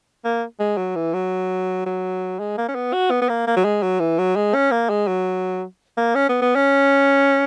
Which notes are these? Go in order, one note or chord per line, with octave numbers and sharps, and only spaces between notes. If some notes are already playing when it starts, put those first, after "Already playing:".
A#3
G#3
F#3
E3
F#3
F#3
G#3
A#3
C#4
B3
F#4
B3
B3
A#3
A#3
F#3
G#3
F#3
E3
F#3
G#3
C#4
A#3
G#3
F#3
A#3
C#4
B3
B3
C#4